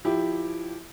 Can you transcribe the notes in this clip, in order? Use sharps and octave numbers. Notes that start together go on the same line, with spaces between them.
F3 E4 G4